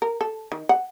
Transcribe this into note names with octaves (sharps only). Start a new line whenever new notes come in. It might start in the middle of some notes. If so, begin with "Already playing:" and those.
A#4
A4
D#3
F#5